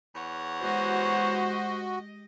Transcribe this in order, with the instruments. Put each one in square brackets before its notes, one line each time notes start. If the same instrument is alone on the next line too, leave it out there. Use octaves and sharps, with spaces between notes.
[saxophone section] E2 C#5 F#5
[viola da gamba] G#3 G4 D#5 [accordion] F#4 [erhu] C5